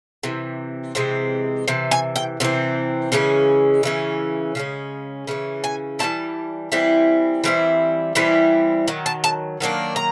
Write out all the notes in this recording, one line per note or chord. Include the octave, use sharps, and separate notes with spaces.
C3 E3
C3 E3 G#3 C4
C3 E3
G#5
G5
C3 E3 C4
C#3 E3 G#3 C#4
C#3 E3 C#4
C#3 E3 G#3 C#4
C#3 E3 C#4
G#5
E3 G3 C4 E4 A5
E3 G3 C4 E4
E3 G3 C4 E4
E3 G3 C4 E4
D#3 F#3
A5
A5
D#3 F#3 A#3 D4
A#5